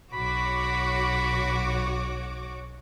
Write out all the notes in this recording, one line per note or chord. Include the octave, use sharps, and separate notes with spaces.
B1 F#4 C#5 B5 D6